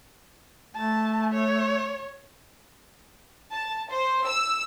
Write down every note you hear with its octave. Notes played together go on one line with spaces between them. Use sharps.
A3 A5
C#5
A5
C5
E6